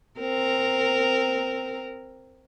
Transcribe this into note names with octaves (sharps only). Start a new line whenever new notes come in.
C4 A#4